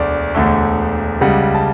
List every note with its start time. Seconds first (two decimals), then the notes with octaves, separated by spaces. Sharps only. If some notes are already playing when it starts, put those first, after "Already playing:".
Already playing: E1 D2 D3 A3 D5
0.35 E1 D2 D3 A3
1.21 C#2 C#3 G3 F#5
1.55 A5